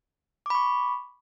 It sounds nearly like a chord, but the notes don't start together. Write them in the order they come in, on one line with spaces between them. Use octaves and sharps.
D6 B5 C#6